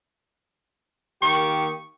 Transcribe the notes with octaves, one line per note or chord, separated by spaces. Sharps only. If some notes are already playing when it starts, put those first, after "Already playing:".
D#3 A#3 G4 C#6